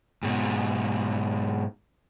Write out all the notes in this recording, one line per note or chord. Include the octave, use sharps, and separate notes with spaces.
G#2 B2